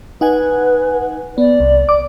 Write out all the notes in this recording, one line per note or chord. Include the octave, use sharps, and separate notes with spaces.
D#4 B4 F#5 G#5
B3 D5
C2
D6